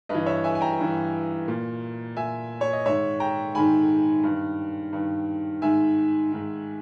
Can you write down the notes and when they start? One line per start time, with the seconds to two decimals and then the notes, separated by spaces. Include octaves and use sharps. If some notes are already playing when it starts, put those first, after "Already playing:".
0.09 G2 E3 B4 D#5
0.26 C#5 E5
0.44 E5 G#5
0.55 G#5
0.61 G5 A#5
0.79 G2 E3
1.48 A#2
2.16 A#2 E5 G#5
2.61 C#5
2.73 D#5
2.85 G#2 D#3 C#5 E5
3.20 G5 A#5
3.55 G#2 D#3 G#5 B5
4.24 G2 D#3
4.93 G2 D#3
5.61 G#2 D#3 E5 G#5
6.31 G#2 D#3